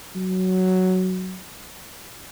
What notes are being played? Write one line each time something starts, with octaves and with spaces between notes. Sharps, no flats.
F#3